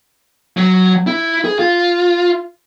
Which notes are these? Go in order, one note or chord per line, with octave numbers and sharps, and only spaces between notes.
F#3
E4
G#4
F4